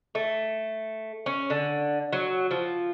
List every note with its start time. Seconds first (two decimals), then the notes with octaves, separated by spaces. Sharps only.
0.15 A3
1.26 C#4
1.50 D3
2.13 F#3
2.51 F3